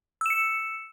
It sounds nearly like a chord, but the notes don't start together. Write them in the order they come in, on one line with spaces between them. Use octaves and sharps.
E6 E7 C#7